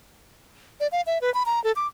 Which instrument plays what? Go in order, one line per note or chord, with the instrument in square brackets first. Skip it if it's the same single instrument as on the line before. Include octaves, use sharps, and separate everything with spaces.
[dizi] D5
F5
E5
B4
B5
A#5
A4
D6